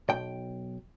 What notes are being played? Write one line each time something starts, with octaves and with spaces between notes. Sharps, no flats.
B1 G5